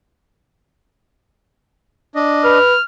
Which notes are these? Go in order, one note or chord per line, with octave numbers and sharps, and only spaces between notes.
D4 D#5
B4 F6